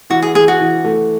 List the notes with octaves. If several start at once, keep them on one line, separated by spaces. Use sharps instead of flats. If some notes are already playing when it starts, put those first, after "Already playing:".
E3 F#4
G#4
E3 G#4
F#4
E3
A3